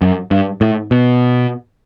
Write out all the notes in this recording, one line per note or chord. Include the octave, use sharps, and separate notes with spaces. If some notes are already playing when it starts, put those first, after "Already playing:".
F#2
G2
A2
B2